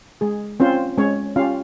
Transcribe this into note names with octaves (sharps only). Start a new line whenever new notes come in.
G#3 G#4
C4 C#4 F4 C5
G#3 C#4 C#5
C#4 F4 G4 F5